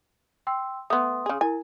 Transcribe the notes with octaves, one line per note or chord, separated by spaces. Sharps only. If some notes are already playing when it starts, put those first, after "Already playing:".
G5 C6 E6
A3 B3 C6 D#6
C#3 G#4
E4 A#4 G#5